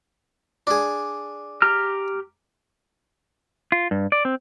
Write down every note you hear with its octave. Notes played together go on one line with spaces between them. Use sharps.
D4 G#4
G4 A#5 F6
F4
G2
D5
C4